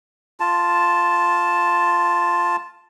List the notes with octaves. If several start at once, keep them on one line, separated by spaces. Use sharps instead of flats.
F4 A5